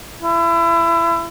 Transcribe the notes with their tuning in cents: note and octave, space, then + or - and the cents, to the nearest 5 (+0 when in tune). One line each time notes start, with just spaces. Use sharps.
E4 +30